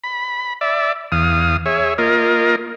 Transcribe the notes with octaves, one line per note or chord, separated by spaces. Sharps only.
B5
D5 E5
E2 F5 D#6
G#4 C#5 E5
A#3 F4 A#4 D#5